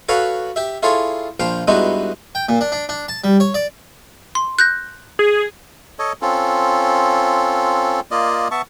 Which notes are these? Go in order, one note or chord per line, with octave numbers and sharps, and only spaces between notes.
F#4 A4 B4 C#5 F5 F#5
G4 E5
E4 F4 G#4 A4 C#5
A#1 F3 C5 F5 G5
G2 G#3 B3 D#4 E4 F#4
G5
A#2
D4
D4
D4
A5
G3
C#5
D5
C6
F#6 G6 A#6
G#4
A4 C#5 D#5
C4 C#4 F4 A4
A#3 F4 D5 D#5
B3 E5 A5 C#6